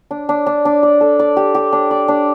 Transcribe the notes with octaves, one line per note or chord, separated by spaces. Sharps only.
D4
D4
D4
D4
D5
A4
D5
G4
G4
D4
D5
D4